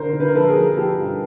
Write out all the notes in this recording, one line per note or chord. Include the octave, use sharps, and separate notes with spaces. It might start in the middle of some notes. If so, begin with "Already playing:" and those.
Already playing: D3 A#4 C5
D3
B4
A#4
F3 A4 B4
G#4 A#4
F3
F3 G4 A4
G2